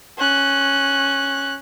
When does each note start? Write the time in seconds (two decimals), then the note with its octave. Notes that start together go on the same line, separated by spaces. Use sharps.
0.18 C#4 F#6